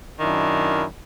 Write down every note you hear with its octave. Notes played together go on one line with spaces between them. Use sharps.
F#2 D#3 D4 E4